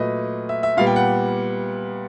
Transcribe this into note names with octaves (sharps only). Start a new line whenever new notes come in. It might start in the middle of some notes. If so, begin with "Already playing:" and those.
Already playing: A#2 F#3 A3 B4 D#5
E5
E5
A#2 G3 B3 F5
G5
F#5